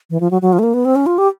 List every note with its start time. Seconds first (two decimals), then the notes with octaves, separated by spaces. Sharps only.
0.10 E3
0.20 F3
0.31 F#3
0.42 F#3
0.53 F3
0.59 A3
0.63 A#3
0.74 B3
0.85 C4
0.95 C#4
1.06 F4
1.18 G4